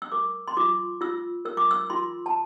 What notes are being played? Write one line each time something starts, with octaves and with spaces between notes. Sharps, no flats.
E6
A#4 D6
C6
F4 D6
F4 E6
A#4 E6
D6
E6
F4 C6
A5